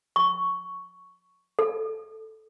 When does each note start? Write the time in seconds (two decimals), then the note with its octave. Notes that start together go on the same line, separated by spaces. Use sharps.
0.16 C#6
1.59 A4